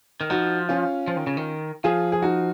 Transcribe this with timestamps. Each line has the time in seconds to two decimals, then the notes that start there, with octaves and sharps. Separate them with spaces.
0.21 D#3
0.30 F3 D#4 F#4
0.69 C#4 F4
1.08 F3
1.17 D#3
1.27 C#3
1.37 D#3
1.84 F3 F4 G#4
2.12 G#4
2.22 D#4 F#4